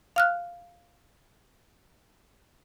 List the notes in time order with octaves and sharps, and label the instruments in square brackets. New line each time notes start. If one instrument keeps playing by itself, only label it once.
[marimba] F5 F6 F#6